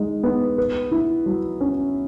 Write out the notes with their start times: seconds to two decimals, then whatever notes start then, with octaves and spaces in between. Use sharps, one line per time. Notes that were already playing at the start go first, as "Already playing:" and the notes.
Already playing: G#3 D#4
0.24 B3
0.58 B4
0.92 E4
1.26 F#3
1.61 C#4